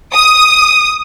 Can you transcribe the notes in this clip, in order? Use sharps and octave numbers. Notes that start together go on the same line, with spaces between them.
D#6